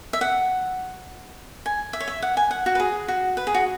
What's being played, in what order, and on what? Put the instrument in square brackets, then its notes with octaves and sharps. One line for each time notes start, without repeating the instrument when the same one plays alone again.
[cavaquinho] E5
F#5
G#5
E5
C#5
E5
F#5
G#5
F#5
F#4
B4
G#4
F#4
B4
G#4
F#4